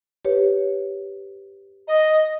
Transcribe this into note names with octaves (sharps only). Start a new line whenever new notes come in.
G4 B4 C#5
D#5